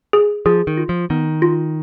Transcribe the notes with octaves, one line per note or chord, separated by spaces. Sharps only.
G#4
F3 G#4
D#3
F4
F3
D#3 B3
F4